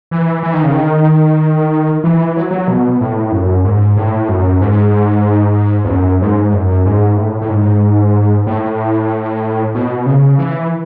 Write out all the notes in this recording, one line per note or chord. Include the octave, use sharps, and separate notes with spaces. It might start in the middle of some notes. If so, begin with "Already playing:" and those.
E3
E3
D#3
C#3
D#3
E3
F#3
F#3
B2
A2
F#2
G#2
A2
F#2
G#2
E2
F#2
G#2
F#2
G#2
A2
A2
G#2
A2
B2
C#3
E3